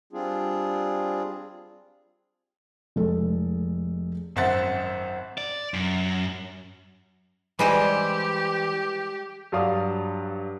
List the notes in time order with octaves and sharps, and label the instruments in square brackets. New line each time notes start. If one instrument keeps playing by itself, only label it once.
[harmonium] G3 C4 D4 F4 G#4
[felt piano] F1 G#3 A4
[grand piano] G#1 F#2 C5 E5 F#5 A6
[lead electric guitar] D5
F#2
[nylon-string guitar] E3 G#5 [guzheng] G3 G#3 C5 [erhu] G4
[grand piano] G2 F#3 D5 F5 D#6